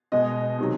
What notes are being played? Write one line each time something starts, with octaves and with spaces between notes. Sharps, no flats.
B2 G#3 D#5
C3 D#3 F#3